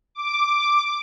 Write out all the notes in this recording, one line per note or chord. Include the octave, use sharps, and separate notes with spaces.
D6